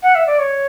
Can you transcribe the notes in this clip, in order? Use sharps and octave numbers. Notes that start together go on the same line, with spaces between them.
F#5
E5
D5
C#5